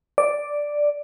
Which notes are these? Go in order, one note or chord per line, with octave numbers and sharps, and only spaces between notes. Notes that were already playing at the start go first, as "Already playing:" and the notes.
D5